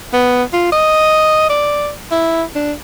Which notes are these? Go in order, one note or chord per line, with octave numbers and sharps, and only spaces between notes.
B3
F4
D#5
D5
E4
D4